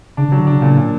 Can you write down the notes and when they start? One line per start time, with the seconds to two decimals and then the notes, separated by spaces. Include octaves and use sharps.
0.17 C#3 D4
0.28 C#3 F#3
0.40 D3
0.47 C#3 D4
0.61 A#2 C#3
0.77 A#2